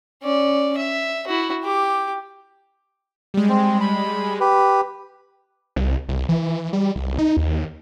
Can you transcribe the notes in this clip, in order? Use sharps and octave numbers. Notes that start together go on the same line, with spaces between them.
C#4 D5
E5
E4 F#4
G4 D6
G3 G#3
C4
B5
G4 B4
C2
C2
E3
G3
C2
D#4
D#2